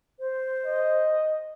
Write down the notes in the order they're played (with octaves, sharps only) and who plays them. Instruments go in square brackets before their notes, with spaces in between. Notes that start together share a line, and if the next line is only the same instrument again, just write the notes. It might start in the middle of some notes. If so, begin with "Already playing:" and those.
[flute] C5
[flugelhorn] D#5